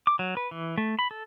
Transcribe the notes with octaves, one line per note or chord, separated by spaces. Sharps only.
D6
F#3
B4
E3
A3
B5
A4